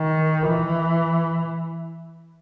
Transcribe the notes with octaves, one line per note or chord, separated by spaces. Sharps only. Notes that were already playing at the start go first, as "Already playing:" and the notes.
Already playing: D#3
E3